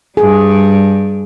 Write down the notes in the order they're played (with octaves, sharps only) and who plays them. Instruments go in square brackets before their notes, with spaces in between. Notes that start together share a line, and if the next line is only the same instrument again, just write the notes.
[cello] G2 G3 [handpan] G#4